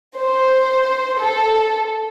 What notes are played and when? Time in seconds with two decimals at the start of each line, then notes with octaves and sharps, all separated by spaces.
0.18 C5
1.20 A4